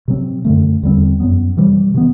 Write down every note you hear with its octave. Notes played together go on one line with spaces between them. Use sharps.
C3 F#3 C4
F#2 D3 A3
E2 D3 G3 C4
F#2 F#3 B3
C3 E3 G3
C3 E3 B3